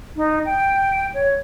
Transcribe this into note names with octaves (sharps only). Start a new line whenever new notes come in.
D#4
G5
C#5